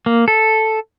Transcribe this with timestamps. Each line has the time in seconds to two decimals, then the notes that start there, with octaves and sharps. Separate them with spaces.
0.06 A#3
0.28 A4